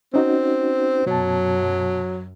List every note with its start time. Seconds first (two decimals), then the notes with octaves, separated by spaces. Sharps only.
0.14 C4 C#4 D#4 F#4
1.06 F#2 B2 F#3 A5